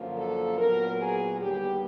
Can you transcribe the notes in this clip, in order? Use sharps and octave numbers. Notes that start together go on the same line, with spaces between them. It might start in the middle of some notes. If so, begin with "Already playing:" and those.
Already playing: F#2 D3 F3 A#3
A4
A#2 F#3 B3 A#4
G#4
D#2 D3 G3 B3 G4